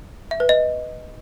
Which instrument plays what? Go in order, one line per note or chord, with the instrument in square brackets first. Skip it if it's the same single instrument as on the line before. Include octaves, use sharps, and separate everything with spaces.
[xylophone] E5
B4
D#5